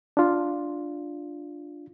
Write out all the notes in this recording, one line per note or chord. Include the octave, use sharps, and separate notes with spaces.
D4 F4